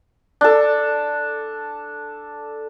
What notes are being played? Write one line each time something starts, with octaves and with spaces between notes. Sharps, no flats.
D4 A4